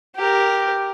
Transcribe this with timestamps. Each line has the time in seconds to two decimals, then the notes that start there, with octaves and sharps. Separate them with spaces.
0.16 G4 A#4